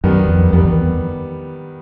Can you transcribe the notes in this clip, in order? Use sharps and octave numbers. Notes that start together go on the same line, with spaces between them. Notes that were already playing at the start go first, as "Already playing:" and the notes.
F#2 D#3 G3 B3
F2
F2 D#3 G3 B3
E2